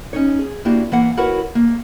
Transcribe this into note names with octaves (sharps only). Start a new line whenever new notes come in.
C#4 D#4 C#5
G#4
A#3 C4 D4 E4 F#4 G4
E3 A#3 F#5
E4 F#4 A#4 B4 C#5 F#5
A#3